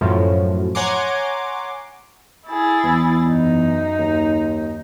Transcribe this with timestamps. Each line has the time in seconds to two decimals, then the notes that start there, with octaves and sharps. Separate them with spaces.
0.01 F#2 A2 F3 F#3
0.75 C#5 F#5 G#5 A#5 C6 D6
2.48 E4 G#4 A6
2.84 E2
3.27 F#2 D#4
3.99 D#2